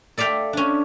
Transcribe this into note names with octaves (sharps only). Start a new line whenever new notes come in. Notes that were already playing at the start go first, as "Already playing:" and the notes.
A4 D5 E5 F5 G5
C#4 D4